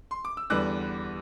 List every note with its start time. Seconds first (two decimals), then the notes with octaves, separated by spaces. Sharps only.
0.11 C6
0.25 D6
0.37 E6
0.50 E2 D3 G3 B3 D6 F#6